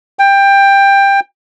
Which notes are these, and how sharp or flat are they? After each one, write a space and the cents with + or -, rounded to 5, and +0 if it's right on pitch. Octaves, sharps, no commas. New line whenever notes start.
G5 +15